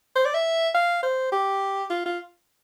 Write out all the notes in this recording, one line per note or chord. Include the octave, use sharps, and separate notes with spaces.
C5
D5
E5
F5
C5
G4
F4
F4